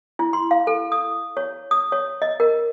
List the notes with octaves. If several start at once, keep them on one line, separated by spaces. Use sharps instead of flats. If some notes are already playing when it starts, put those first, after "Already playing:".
E4
C6
F5
A4
D#6
C#5
D#6
C#5
D#5
A#4